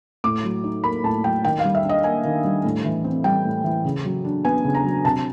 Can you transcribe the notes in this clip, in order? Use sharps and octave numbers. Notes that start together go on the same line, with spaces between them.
A2 D6
F#3
D#4
A#3 B5
A2 A5
F#3 G5
D#3 G5
F5
G3
E5
D4
D#5
A#3 G#5
D#3
G3
A2
E3
C4
G3 G5
A2
E3
C#3
F#3
D4
B3 G#5
C#3
A#5
F#3
C3 A5